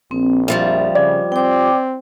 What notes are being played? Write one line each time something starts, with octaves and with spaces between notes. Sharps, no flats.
A#1 C4
F2 F3 G3 E5
C#3 D5
C4 G5 D6